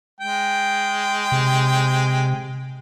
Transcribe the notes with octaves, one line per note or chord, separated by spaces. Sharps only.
G#3 G5
C3